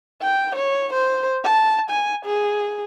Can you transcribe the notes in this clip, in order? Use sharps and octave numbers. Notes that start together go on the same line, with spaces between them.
G5
C#5
C5
A5
G#5
G#4